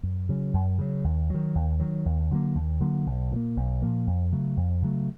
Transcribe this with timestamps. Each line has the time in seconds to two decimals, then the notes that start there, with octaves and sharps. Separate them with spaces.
0.03 F#2
0.29 C#3 F#3
0.54 F#2
0.78 C#3 F#3
1.04 D#2
1.30 D#3 F#3
1.55 D#2
1.80 D#3 F#3
2.06 D#2
2.31 D3 F#3 A#3
2.55 D#2
2.81 D3 F#3 A#3
3.06 B1
3.31 A#2 F3
3.36 A#3
3.56 B1
3.82 A#2 F3 A#3
4.07 F2
4.32 C#3 F#3 A3
4.57 F2
4.82 C#3 F#3 A3